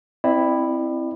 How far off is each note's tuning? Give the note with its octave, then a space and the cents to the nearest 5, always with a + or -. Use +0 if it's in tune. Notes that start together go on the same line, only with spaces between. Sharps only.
C4 +0 E4 +0 D5 +40